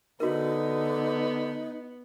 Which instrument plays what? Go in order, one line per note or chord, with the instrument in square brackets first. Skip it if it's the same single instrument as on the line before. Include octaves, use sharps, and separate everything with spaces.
[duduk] D3 [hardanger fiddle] B3 [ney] D#4 [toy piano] F#4 A#4